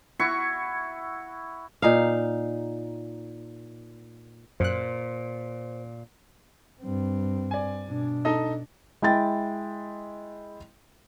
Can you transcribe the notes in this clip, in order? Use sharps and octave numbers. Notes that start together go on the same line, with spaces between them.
E4 F#4 C#6
A#2 D#4 F5
F#2 A#2 C5 F#6
G2 C4
D5 G#5
B2 D4
D#4 A4 D#5
G#3 E4 G5 A6